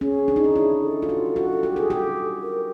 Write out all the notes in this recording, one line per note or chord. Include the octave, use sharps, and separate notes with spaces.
C#4 G#4
D4
D#4
D4
E4
A4
F4
F#4
F#4
G4
G#4
G4
A#4